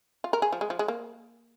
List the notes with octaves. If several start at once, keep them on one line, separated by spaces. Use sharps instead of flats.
F4
A#4
G#4
F3
G#3
F3
G#3
A#3